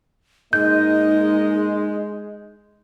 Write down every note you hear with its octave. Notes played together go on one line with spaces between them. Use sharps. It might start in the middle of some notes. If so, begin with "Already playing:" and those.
G#2 G#3 A#3 D#4 D#5 G6